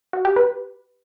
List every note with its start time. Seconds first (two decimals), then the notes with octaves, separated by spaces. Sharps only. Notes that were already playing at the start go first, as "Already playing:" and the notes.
0.13 F#4
0.25 G4
0.36 B4